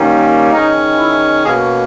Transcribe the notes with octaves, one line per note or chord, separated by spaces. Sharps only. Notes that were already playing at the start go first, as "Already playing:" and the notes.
Already playing: D#3 G3 A#3 C#4
D#3 G#3 C#4 D#4
E4
B2 A#3 C#4 G#4